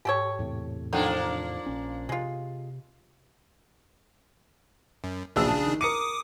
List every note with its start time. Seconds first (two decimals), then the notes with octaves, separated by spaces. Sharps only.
0.05 G#2 G4 A4 C#5
0.39 E2 A2 C3
0.93 F3 A#3 D4 D#4 A4 F#5 G5
1.66 A#1 C#4
2.09 C3 G#3 F4
5.04 F#2
5.36 D1 A#1 C#3 D4 G#4 E6
5.48 A5
5.66 D#3
5.81 A#4 D6 D#6 C#7 D#7